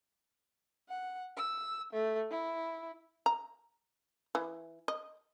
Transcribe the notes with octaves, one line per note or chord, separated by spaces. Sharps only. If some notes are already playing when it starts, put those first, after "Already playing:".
F#5
E6
A3
E4
A#5
E3
D#5